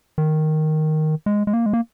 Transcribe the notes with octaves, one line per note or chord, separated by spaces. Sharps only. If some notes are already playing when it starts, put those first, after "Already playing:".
D#3
G#3
G#3
A#3
G#3
A#3